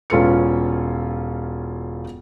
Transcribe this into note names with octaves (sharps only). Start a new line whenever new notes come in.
E1 C#4 F4 A4 B4 C#7